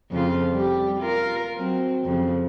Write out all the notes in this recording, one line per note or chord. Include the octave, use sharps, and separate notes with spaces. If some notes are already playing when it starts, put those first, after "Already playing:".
F2 C#3 F4
G3 G4
F4 A#4
F#3 C4
F2 C#3